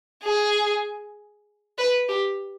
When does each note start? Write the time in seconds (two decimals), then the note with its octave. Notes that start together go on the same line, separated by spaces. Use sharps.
0.23 G#4
1.78 B4
2.09 G4